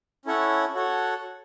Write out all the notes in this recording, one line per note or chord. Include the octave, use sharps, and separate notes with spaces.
C#4 E4 A4 C#5 F#5
F#4 A4 C#5 F#5